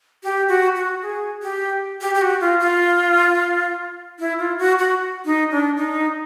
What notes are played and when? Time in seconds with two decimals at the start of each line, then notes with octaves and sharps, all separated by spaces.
0.23 G4
0.49 F#4
0.76 F#4
1.02 G#4
1.42 G4
2.01 G4
2.14 G4
2.21 F#4
2.41 F4
2.60 F4
4.19 E4
4.39 F4
4.58 F#4
4.78 F#4
5.25 D#4
5.51 D4
5.77 D#4